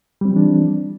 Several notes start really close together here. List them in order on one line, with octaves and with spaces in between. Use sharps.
G3 C4 F3 E3 D4